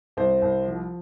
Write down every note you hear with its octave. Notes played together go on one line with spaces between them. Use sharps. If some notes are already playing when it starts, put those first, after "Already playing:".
C2 C5
C2
F3